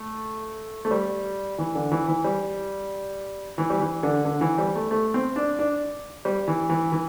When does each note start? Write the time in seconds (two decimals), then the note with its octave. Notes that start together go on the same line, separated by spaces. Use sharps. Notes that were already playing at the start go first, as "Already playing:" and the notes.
Already playing: A3
0.85 A3
0.91 G3
1.58 E3
1.75 D3
1.92 E3
2.08 E3
2.24 G3
3.58 E3
3.70 G3
3.80 E3
4.03 D3
4.25 D3
4.41 E3
4.58 G3
4.75 A3
4.91 A3
5.14 C4
5.36 D4
5.59 D4
6.25 G3
6.48 E3
6.69 E3
6.92 E3